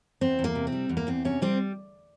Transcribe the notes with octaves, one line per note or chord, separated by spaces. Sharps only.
E2 C4
E2
A#3
C3
C4
G3
E2
A#3
E2 C4
C3 C#4
G3 C4